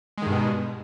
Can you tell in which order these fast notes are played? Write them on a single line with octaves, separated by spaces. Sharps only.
G#3 D#3 G2 B2